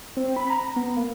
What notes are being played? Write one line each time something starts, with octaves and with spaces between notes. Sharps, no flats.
C4
B5
A#5
B3
A#3